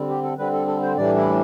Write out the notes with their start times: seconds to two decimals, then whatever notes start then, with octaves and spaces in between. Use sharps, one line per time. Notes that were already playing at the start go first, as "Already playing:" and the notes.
Already playing: D3 G3 C4
0.09 G4
0.23 A4
0.38 D3 G3 C4 B4
0.53 A4
0.67 A4
0.82 C5
0.97 A2 E3 G3 D4 D5
1.17 E4